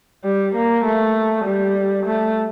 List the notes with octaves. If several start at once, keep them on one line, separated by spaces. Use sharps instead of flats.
G3
A#3
A3
G3
A3